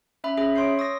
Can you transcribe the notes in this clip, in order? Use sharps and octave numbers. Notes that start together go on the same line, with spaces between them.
C#4 E5 B5
C#4 G#4 E5 B5
C#5 C6 D#6 G6 C7
C#6 D#6 E6 A#6